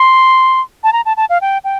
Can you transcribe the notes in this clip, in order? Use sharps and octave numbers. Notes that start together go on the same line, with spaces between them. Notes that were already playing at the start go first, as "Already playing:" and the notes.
Already playing: C6
A5
A#5
A5
A5
F5
G5
G5